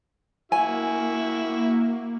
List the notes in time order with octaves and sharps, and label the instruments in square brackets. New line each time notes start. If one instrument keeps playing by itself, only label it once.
[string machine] A#3 [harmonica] E4 F#4 [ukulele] G#5